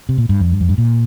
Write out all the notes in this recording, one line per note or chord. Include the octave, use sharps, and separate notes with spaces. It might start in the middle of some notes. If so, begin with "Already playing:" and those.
C3
A#2
G2
F2
G2
F2
G2
A#2